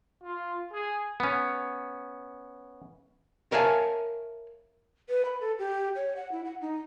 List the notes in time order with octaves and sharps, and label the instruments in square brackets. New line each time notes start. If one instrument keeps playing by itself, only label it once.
[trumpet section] F4
G#4
[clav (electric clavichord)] B3 C#4
[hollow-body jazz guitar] A#4 C#5 E5 F5 G#5 A5
[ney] B4
B5
A4
G4
C#5
F#5
E4
F#5
D#4